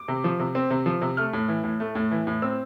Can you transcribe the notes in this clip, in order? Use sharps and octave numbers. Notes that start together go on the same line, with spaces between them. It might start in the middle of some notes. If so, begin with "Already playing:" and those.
Already playing: D6
C3
F3
C3
C4
C3
F3
C3
A3 F6
A2
E3
A2
A3
A2
E3
A2
C4 E6